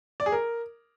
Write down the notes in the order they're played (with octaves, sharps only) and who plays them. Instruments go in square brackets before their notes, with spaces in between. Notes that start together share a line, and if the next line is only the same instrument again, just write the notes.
[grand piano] D5
G#4
A#4